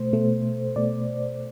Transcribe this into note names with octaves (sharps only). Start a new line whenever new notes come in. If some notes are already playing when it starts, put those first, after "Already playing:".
Already playing: B2 A3 C5
B2 A3
B2 A3 D5